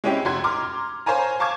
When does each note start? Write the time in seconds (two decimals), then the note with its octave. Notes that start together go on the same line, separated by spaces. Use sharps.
0.04 G#3 C4 C#4 E4 G4
0.25 F1 F#4 C6 G#6
0.44 A#5 C6 D6 F6
1.06 C5 C#5 F5 G#5 A#5
1.40 F5 A5 C#6 D6 G#6